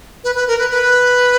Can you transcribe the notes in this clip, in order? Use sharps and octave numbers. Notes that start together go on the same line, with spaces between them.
B4
B4
A#4
B4
B4